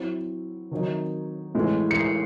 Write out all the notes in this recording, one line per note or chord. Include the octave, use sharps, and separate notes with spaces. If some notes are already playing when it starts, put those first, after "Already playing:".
Already playing: F#3 C4 E4
D#3 F#3 C4 D#4
A2 E3 G#3
C#7
C7